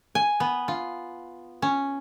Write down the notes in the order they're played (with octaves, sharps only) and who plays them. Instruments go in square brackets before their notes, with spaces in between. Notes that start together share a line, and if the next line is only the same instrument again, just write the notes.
[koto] G#5
B3
F4
C#4